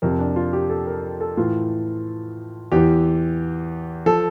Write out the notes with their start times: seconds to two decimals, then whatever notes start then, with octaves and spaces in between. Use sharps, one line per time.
0.02 F2 C3 F3 A#4
0.19 D4
0.36 F4
0.53 G4
0.70 A4
0.87 A#4
1.21 A4
1.37 A2 E3 F4
2.72 E2 E3 G4
4.06 F3 A4